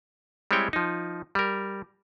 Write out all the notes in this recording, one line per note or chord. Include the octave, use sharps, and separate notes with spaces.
G3 G#3 C4 E4 C#5 G5
F3 D#4
G3 A#4